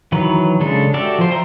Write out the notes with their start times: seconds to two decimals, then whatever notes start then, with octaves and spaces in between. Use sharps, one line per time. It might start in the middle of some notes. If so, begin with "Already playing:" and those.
0.12 D#3 E3 F#3 B4
0.60 C#3 G#3 D4 A4
0.94 F#4 G4 A4 D5 E5
1.19 F3 C5
1.31 C5 E5 G5 A#5